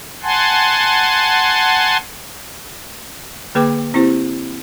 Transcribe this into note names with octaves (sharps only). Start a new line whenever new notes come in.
F#5 G#5 A5 C6
D3 A#3 G#4 B4 G5 D6
C4 E4 G4 C5